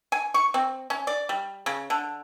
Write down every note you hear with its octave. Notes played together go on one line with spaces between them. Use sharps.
G#5
C#6
C4
C#4
D5
G3
C#3
D3